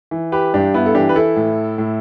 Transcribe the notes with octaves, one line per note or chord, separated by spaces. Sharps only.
E3
G4 B4
G2 D4 G4
B3 E4
A4
E3 D4 G4
B4
E4 A4
A2
A2